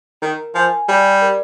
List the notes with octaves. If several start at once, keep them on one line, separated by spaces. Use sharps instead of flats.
D#3 A#4
F3 G#5
G3 D5
A#4